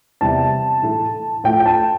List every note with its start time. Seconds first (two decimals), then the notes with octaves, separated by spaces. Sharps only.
0.21 E2 C3 G3 A5
0.82 A2 E3 A3
1.44 A2 F3 A3 G5
1.60 G5
1.66 A5